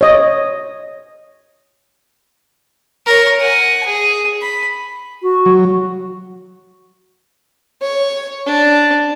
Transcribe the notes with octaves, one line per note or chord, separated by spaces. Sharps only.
C#5 D#5
A#4 C#5
F#5 G#5
G#4
B5
F#4
F#3
C#5
D4